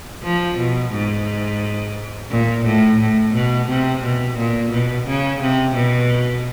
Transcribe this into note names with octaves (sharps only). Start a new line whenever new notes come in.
F3
B2
G#2
A#2
A2
A2
B2
C3
B2
A#2
B2
C#3
C3
B2